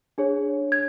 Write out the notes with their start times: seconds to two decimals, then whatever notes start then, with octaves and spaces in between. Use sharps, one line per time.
0.18 D4 G#4 C#5
0.72 G#6